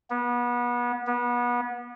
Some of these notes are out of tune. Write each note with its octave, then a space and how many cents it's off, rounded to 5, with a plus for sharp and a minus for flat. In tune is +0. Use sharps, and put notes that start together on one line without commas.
B3 -30
B3 -30